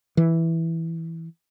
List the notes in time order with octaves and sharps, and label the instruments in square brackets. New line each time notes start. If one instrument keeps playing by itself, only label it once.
[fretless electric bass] E3